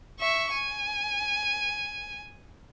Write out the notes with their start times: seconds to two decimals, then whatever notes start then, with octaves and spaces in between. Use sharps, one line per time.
0.20 E5 C#6
0.53 G#5